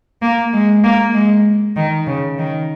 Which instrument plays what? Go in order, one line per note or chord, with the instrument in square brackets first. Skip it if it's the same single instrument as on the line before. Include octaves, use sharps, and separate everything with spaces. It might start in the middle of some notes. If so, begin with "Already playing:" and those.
[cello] A#3
G#3
A#3
G#3
D#3
C#3
D#3